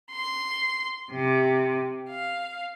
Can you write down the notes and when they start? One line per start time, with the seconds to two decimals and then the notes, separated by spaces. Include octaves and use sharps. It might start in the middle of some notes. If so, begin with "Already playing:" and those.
0.11 C6
1.12 C3
2.08 F5